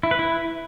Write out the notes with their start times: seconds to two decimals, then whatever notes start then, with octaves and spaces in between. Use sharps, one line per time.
0.03 E4
0.11 B4
0.19 E4